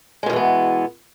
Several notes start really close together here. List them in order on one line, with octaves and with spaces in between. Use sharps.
G#3 B2 D#3 E3 B3